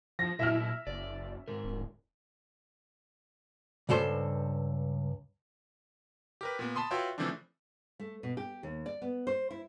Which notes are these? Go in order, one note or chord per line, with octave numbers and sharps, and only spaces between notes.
F3 A#6
A#2 F#3 E4 D#5 E5 F6
F#1 D5
G#2 A#4
D1
C#2 G2 A4 C5
G4 A#4 B4
A#2 B3
A5 B5 C6 D#6
F4 F#4 B4 C#5 E5 G5
C#3 E3 F3 A3 C4 D4
A3
B2
G4
D#2
D5
B3
C5
E4